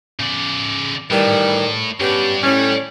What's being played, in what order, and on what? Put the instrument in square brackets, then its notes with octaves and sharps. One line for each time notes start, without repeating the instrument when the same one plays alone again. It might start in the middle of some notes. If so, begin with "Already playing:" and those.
[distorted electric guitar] C#3 D5
[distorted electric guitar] A2 [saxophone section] D#3 E3 G3
[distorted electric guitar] G2 D4 [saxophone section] B3 C#4 G4
[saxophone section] A2 C#4 [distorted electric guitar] G3